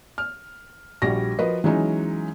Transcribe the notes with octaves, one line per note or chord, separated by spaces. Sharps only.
F6
A#1 G3 F#4 A#6
F3 F#4 A#4 B4 D#5
E3 F#3 G#3 C#4 D#4